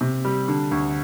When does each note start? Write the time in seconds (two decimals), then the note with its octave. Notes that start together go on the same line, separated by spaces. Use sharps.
0.01 C3
0.25 G3
0.48 D3
0.71 D2